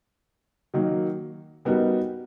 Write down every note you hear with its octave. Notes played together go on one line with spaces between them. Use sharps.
D#3 F#3 A#3
G3 B3 D#4 F#4 A#4